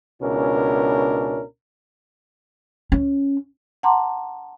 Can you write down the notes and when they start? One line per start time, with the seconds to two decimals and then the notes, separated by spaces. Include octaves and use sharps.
0.22 C#2 B2 C#4 D4 E4 A#4
2.92 C#4
3.83 F#5 A5 A#5 C6 D6